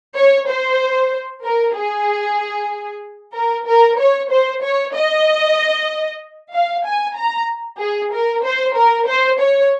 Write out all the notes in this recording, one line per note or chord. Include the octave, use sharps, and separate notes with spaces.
C#5
C5
A#4
G#4
A#4
A#4
C#5
C5
C#5
D#5
F5
G#5
A#5
G#4
A#4
C5
A#4
C5
C#5